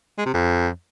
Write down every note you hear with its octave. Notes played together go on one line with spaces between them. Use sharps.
G#3
C3
F2